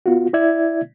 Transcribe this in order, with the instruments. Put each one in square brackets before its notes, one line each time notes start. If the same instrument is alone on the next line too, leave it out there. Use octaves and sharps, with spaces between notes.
[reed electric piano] B3 F4 F#4
E4 D5 E5 G#6